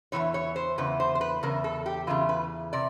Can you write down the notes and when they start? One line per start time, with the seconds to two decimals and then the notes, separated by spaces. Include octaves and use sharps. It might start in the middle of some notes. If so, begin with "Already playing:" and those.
0.12 E2 C#3 E3 C#5
0.34 C#5
0.56 C5
0.78 E2 C#3 B4
1.00 C5
1.15 C5
1.21 B4
1.43 E2 C#3 A#4
1.64 A4
1.86 G4
2.07 E2 C#3 E3 F4
2.29 B4
2.73 C3 D5